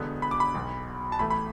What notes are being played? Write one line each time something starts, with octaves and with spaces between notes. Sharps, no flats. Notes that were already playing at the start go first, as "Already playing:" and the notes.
Already playing: E1 E2 D3 B3
B5
D6
B5
B1 B2 B3
A5
A1 A2 A3 B5
B5